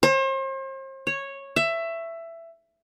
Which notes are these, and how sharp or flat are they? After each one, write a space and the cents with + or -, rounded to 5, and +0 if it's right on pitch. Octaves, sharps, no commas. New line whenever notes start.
C5 +40
C#5 -10
E5 +15